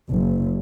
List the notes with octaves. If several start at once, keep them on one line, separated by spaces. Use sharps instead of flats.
F#1